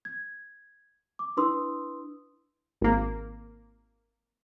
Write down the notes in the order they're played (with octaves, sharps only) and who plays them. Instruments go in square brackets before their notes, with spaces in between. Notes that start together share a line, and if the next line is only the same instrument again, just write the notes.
[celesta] G#6
D6
D4 E4 B4 C6 D#6 E6
[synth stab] G#1 A#3